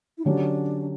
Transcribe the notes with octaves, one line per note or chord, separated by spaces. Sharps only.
E4
D3 F#3 C#4 D4 G4